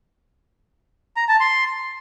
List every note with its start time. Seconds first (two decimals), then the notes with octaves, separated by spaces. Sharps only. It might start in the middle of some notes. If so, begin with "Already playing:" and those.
1.17 A#5
1.28 A5
1.40 C6